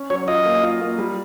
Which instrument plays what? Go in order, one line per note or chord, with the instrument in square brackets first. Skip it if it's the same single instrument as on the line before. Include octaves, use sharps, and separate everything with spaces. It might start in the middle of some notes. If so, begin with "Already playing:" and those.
Already playing: [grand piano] C#4
[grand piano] F#3 [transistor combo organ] C#5
[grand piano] F4 [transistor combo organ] D#5
[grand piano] A#3
F4
A#3
G3